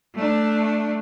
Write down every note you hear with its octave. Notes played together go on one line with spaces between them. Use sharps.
A3 D4